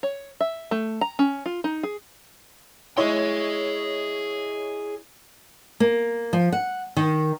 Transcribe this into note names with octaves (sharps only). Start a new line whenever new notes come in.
C#5
E5
A3
A#5
C#4
F4
D#4
G#4
E4 G#4 C#5 D#5 C6
A#3
F3
F#5
D#3